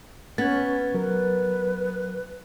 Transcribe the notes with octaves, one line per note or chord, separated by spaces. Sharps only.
B3 C#4 G#6 A6
F#3 A#4 B4